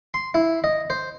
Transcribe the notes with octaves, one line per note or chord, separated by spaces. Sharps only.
C6
E4
D#5
C5